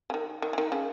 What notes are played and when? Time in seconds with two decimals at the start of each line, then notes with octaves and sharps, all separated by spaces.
0.10 C#3
0.14 D#3
0.42 D#3
0.53 E3
0.58 D#3
0.72 C#3